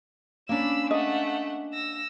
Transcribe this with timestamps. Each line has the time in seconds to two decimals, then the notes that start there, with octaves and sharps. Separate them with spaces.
0.49 A#3 C#4 D4 B5 E6
0.91 A3 D#5 F#5
1.74 E6 A#6